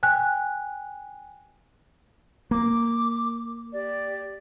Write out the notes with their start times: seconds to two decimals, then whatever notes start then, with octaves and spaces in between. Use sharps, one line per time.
0.03 G5 G#5 F#6
2.51 A#3 D6
3.72 G4 D5